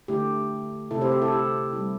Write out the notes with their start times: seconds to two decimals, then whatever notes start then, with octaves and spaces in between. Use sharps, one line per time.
0.08 D3 A3 E4 G4
0.91 C3 A3 C4 E4 A4
1.01 G4 C5
1.11 G4
1.22 E4 A4
1.32 G4
1.73 G3 E4